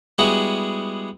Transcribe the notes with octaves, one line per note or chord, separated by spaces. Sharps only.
G3 G#3 B3 E4 F#4 G#4